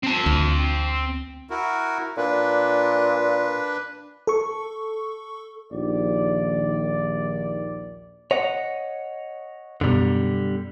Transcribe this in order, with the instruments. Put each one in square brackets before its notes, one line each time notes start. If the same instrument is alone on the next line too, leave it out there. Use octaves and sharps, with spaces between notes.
[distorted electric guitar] C4 A5
[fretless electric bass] D2
[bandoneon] E4 F#4 A#4
[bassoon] A#2 [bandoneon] D4 B4
[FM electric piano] A4 C#6
[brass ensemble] A#1 D#2 D5
[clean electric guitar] C#5 D#5 F#5
[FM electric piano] F#2 B2 [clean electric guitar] D3 G3